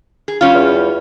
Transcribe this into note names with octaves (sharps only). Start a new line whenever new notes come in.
G#4
G3 C#4 F4
E2